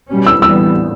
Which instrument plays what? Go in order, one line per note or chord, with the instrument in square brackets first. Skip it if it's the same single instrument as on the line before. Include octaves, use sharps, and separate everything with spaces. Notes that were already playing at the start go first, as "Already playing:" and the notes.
[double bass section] B2 G3 C#4
[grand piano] E6
[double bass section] A2 E3 G3 B3 [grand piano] E6